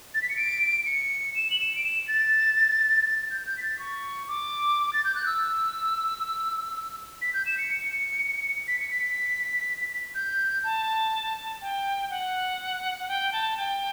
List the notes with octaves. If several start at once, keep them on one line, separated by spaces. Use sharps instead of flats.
A6
B6
C#7
D7
C#7
E7
F#7
E7
D7
E7
A6
G6
G6
B6
A6
C#6
D6
A6
G6
F#6
E6
B6
G6
E7
C#7
B6
C#7
B6
G6
A5
G5
F#5
F#5
G5
A5
G5